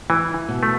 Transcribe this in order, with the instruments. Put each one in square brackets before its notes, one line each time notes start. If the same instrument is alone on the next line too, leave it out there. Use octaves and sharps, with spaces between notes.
[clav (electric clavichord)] E3 [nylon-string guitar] E4
[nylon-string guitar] B2
[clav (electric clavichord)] A3